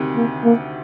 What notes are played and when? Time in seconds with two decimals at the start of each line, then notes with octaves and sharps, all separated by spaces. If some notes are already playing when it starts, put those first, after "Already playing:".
Already playing: D2 C3 D#3
0.16 A#3
0.44 A#3